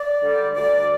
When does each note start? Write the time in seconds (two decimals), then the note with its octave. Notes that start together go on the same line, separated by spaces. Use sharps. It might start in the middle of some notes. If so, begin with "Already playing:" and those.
Already playing: D5
0.21 D3 G3
0.55 D2 D5